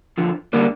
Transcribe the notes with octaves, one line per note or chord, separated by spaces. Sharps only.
F2 D3 F3
D3 G3 A#3 D4